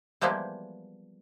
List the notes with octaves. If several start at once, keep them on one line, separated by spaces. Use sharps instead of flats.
E3 F3 G3 G#3 A#3 B3